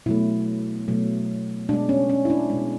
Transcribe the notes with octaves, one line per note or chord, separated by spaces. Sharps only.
B2 F#3 A3 E4
B2 F#3 A3
B2 G#3 D4
C#4
C#4
E4
D4
B2 G#3